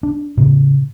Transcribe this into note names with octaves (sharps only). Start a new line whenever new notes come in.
D4
A2 C#3